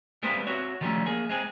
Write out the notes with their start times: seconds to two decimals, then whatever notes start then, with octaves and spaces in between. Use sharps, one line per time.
0.23 G3 G#3 B3 C4 B4 C5
0.47 C4 F#4 C#5
0.81 D#3 F3 G3 A3 C#4
1.06 A#3 G#4
1.29 G#3 C4 G#4